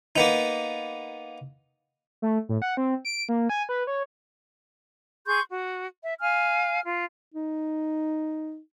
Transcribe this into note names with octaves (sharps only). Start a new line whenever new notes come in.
A#3 B3 D#4
A3
A2
F#5
C4
D7
A#3
G#5
B4
C#5
G#4 C6 C#6 G6
F#4
E5
F5 G#5 F6
F4
D#4